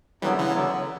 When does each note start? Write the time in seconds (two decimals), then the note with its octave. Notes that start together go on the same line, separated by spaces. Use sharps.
0.22 F#2 D3 E3 F#3 G3 B3
0.38 C#3 E3
0.54 F#2 D3 F#3 B3